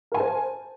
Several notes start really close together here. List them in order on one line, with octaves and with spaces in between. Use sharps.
A#4 G#5 A5 C5